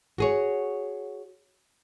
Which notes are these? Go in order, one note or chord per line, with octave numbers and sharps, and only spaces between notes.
F#4 G#4 C#5